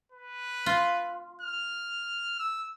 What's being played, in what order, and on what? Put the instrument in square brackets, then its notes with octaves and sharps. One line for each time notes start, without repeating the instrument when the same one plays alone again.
[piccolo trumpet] B4
[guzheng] F4
[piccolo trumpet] F6
E6